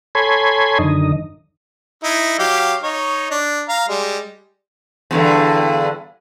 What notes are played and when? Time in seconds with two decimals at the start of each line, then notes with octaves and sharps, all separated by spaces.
0.15 A4 C#5 G#5 B5 C6 G#6
0.79 F#2 D3 D#3 D#5
2.03 D#4 E4
2.39 F#3 G4 F5
2.83 D#4 C#5
3.31 D4
3.69 F5 A#5
3.88 G3 G#3
5.11 E2 G2 D3